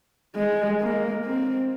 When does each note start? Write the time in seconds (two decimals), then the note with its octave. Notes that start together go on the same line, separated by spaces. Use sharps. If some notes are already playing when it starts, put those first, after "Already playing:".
0.36 G#3
0.81 A#3
1.26 C4